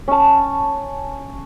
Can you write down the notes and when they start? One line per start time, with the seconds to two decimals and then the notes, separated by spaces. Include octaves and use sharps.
0.08 C#4 A5